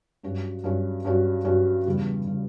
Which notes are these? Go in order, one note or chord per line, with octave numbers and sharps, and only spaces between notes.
G2 F#3 C#4 F#4
G2 F#3 C#4 F#4
G2 F#3 C#4 F#4
G2 F#3 C#4 F#4
E2 C#3 G3
C#3 G3